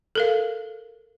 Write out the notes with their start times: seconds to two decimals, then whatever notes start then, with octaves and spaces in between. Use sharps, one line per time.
0.15 A4 A#4 F5